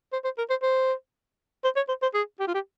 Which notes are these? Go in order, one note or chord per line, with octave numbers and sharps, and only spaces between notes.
C5
C5
A#4
C5
C5
C5
C#5
C5
C5
G#4
G4
F4
G4